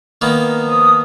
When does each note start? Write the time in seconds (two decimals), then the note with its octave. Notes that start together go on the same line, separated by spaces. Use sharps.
0.21 D#3 A#3 B3
0.65 F3 D#6